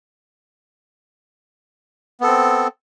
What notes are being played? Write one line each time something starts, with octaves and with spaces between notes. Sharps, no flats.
B3 C4 A4